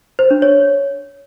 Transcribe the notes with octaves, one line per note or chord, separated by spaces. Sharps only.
C5
D4
C#5